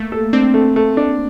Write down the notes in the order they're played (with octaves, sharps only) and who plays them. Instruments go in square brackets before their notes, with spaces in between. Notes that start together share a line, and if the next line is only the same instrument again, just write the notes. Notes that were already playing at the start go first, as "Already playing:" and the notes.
Already playing: [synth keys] A3 A#3
[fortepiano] A4
[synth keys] C4 [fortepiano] D4
[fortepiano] A3
A3
D4